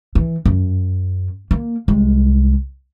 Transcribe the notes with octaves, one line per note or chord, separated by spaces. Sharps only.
E3
F#2
A#3
C2 G#3